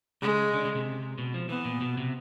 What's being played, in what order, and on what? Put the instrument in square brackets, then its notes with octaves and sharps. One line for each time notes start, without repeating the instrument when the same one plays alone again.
[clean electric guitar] C#3 [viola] G#3
[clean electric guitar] D3
C#3
C3
B2
F3
[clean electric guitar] E3 [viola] B3
[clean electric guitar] A#2
B2
C3